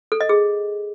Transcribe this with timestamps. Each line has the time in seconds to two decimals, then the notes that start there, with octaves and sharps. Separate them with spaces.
0.12 A4
0.21 D#5
0.29 G#4